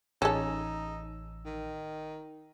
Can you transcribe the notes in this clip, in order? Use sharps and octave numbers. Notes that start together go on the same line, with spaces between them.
A1 C#4 D#4 A4 E6
D#3